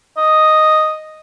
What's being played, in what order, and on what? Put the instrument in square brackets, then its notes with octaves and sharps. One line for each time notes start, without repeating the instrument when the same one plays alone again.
[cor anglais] D#5